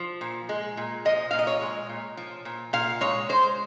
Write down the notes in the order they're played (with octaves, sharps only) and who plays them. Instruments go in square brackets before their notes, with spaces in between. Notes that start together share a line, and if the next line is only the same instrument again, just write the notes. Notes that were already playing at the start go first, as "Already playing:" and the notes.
Already playing: [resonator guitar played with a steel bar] F3
A#2
G#3
A#2
F3 D#5
A#2 F5
D#5
C#5
G#3
A#2
F3
A#2
A#2 F5
G#3 C#5
G#3 C5